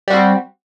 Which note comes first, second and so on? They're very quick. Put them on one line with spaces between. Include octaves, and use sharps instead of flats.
G3 F#4 C4